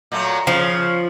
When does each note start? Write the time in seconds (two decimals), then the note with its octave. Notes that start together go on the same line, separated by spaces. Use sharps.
0.12 A#2 F#3 A3
0.47 C#3 F3